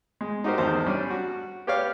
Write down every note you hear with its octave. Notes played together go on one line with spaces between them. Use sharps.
G#3
D#4 F#4 G4 A#4 C5
G#1 E2 D#4 C5 A5 C6
G3 C#4 D4
F#4
G4 B4 C#5 D5 F5